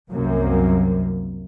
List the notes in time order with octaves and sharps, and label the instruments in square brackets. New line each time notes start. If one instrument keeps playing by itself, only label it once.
[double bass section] C2 F#2 C3 A#3